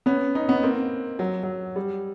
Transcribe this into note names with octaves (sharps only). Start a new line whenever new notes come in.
B3 C#4
C#4 D#4
B3 C#4
A#3 C4
F#3
F#3
G3